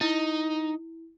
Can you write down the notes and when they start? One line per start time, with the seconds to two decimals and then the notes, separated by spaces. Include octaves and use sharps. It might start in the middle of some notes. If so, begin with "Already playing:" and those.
0.01 D#4 E4